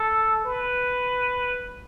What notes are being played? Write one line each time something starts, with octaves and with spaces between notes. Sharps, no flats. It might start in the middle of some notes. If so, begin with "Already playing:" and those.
Already playing: A4
B4